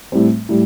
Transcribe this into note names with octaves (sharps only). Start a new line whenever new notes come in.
A2 G3 C4
A2 G3